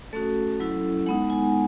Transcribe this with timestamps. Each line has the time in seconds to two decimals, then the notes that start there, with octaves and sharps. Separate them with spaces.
0.13 A3 C#4 F#4 A4
0.60 F#3 C#4 E4
1.06 G#3 B3 D#4 F#5
1.30 G#5